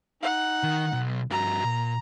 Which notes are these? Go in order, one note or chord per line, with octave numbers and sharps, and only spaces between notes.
D#4 F#5
D#3
B1
G2 F#4 A#5
A#2